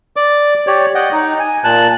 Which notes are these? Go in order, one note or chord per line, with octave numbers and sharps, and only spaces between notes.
D5 D6
G4 C#5 D5
D#5 F#5 G5
D#4
G#5
A#2 A5 F#6